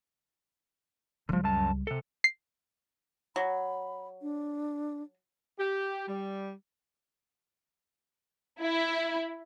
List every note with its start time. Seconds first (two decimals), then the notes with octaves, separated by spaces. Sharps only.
1.29 C#2 D3 F3 G3
1.44 F#2 A5
1.87 C3 A4
2.24 C7
3.36 F#3 B5
4.22 D4
5.58 G4
6.08 G3
8.60 E4